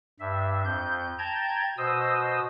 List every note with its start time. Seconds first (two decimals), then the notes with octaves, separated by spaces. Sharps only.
0.20 G2 E5
0.65 F2 G6
1.19 G5 A5 A#5 G6 G#6
1.78 B2 C5 D#5 D#6 E6